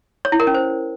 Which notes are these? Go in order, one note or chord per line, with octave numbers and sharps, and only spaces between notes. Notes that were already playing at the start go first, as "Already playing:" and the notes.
C#5
E4
A#4
C#4
C5